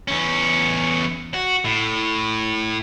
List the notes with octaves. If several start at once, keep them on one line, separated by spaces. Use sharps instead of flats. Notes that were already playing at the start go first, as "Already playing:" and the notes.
E2 C#4
F#4
A2